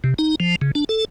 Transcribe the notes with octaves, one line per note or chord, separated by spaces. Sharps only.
C3
D#4
F3
C#3
D4
A4